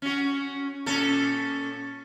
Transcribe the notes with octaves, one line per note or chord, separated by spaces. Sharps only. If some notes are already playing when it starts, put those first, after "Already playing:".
C#4 F#4
A#2 C#4 A4